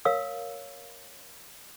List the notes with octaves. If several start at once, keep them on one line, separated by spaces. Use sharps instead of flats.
A#4 C#5 F5 E6